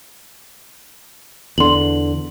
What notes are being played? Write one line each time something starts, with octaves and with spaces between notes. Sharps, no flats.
E2 D3 C6 F#7